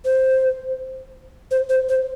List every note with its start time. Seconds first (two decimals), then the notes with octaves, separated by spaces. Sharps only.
0.05 C5
1.51 C5
1.70 C5
1.89 C5